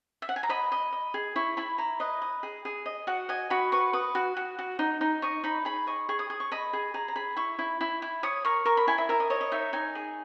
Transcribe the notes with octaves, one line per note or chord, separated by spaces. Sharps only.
E5
F#5
G#5
A#5
D#5 B5
D#5
D#5
G#4
E4 C#6
E4 B5
E4 A#5
B4 D#5
D#5
G#4
G#4
D#5
F#4 F#5
D#5 G#5
F#4 B5
B4 C#6
B4 D#6
F#4
F#4
F#4
D#4
D#4
D#5 C#6
D#4 B5
G#4 B5
D#5 C#6
G#4 C#6
D#6
G#4 D#6
C#6
D#5 B5
G#4
G#4 A#5
A#5
G#4 B5
E4 C#6
E4
E4
E4
C#5 D#6
A#4 C#6
A#4 C#6
B5
E4 G#5
E5
A#4 E5
D#5
C#5 D#5
D#5
D#4 E5
D#4 G#5
G#4